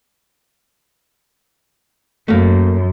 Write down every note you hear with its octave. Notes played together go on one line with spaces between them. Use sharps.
F#2 A3 A#3